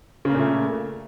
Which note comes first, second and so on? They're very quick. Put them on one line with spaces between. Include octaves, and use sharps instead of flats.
C#3 A#3 A#2 A3